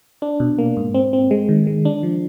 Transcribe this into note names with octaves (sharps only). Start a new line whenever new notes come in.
D4
B2
A#3
G#2
C4
C4
G#3
D#3
G#3
D4
F3